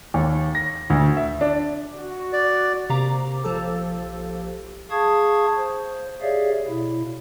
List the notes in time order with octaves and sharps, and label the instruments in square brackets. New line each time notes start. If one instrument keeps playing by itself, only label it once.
[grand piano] D#2
A#6
D2
E5
D4
[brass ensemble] F#4
[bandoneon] D5
[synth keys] C3 A#3 A#5 D6
A#1 F3 G4 A4
[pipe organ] G#4 F5 A5 C#6 D#6 G#6
C5
G4 G#4 C#5 D5 E5 F5
B2 E4